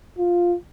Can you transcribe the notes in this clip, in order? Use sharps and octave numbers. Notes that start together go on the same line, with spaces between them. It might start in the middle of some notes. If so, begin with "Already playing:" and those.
F4